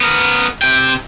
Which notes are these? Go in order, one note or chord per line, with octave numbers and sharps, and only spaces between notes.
B3 A#4
C3 G5